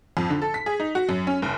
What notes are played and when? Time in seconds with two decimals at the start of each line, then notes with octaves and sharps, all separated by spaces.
0.17 F2
0.30 D3
0.42 A4
0.54 B6
0.66 G#4
0.80 D#4
0.95 F#4
1.09 F#2
1.27 C#4
1.42 F#1